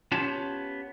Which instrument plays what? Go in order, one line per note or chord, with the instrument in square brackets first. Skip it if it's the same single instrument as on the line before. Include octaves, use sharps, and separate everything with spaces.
[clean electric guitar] B3 C#4 F4 G4 C#5 A5